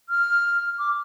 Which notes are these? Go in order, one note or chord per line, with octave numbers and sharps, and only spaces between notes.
F6
D6